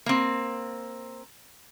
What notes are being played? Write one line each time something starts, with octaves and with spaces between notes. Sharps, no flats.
A#3 C4